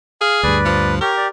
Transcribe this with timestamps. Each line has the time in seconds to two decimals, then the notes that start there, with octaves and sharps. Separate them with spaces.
0.21 G#4 F5
0.43 D2 G2 B4 D5
0.65 F3
1.01 G4 A#4 C#5
1.17 D5